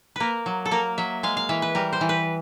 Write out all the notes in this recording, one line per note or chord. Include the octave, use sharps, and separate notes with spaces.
A#3 A#4 B4
F#3
A4
A#3 A#4
F#3 E5
G#3 F5
F5
E3 E5
B4
G3 A#4
C5
E3
B4